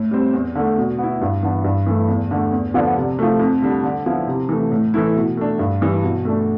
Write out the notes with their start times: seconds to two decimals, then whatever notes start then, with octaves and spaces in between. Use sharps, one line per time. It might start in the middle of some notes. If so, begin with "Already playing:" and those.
Already playing: A2
0.11 G3 C4
0.33 E2
0.55 D3 A3
0.78 B2
0.99 B3 E4
1.21 G2
1.43 E3 B3 D4
1.64 G2
1.87 E3 A3
2.08 E2
2.31 D3 A3 D4
2.52 E2
2.74 D3 F3 B3 D4
2.96 C3
3.19 F3 A3
3.40 F2
3.62 D3 G3 D4
3.83 D3
4.06 F3 B3 E4
4.27 C3
4.49 E3 A3
4.71 A2
4.94 E3 A3 E4
5.16 B2
5.37 A3 D4
5.59 G2
5.81 E3 G3
6.03 B2
6.25 A3 D4